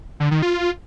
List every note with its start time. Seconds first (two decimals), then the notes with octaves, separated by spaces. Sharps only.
0.20 D3
0.31 D#3
0.42 F4